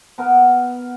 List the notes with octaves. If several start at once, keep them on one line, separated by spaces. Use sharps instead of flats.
B3 A#4